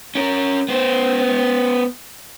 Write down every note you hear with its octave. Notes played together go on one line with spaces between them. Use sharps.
C#4 A#4
B3 C5